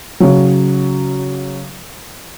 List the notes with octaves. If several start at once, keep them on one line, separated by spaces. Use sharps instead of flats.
C#3 F#3